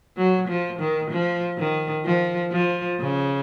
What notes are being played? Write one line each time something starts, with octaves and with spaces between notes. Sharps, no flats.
F#3
F3
D#3
F3
D#3
F3
F3
C#3